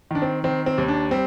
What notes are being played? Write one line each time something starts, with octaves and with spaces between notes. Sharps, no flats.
D#3 D4
C4
D#3 C4
C4
D#2
D4
G3 C4